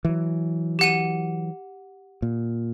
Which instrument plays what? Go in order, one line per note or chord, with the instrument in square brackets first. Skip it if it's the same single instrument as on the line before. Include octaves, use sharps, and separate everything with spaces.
[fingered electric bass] E3 F#3
[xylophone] G4 F#5 D#7
[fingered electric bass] A#2